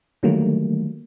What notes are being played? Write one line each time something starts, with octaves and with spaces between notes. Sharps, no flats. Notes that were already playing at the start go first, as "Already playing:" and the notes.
D3 D#3 F#3 G3 A3 A#3